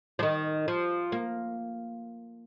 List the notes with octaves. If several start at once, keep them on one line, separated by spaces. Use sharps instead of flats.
F3
D#3
F3
A#3